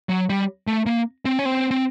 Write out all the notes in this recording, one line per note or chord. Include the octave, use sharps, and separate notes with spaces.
F#3
G3
A3
A#3
C4
C#4
C4
C4